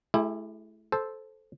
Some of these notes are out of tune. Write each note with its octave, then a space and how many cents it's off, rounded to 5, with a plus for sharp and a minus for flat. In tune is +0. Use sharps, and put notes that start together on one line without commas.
A3 -35 E4 +10 G4 +35
A4 -10 C5 +0